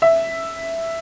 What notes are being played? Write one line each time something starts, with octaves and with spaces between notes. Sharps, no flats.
E5